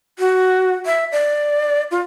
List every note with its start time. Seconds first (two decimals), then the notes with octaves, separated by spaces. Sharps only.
0.19 F#4
0.86 E5
1.12 D5
1.91 F4